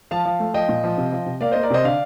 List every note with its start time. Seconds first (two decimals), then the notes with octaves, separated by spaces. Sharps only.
0.11 F3 F5 A5
0.25 F3
0.40 A3
0.54 F3 D#5 G5
0.69 A#2
0.84 F3
0.98 C3
1.12 F3
1.26 C3
1.41 A#3 D5 F5
1.51 A#3 C5 D#5
1.63 A#4 D5
1.70 C3 C5 D#5
1.84 D3 D5 F5